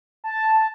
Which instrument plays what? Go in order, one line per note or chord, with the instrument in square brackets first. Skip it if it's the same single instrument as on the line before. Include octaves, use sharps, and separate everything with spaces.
[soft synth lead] A5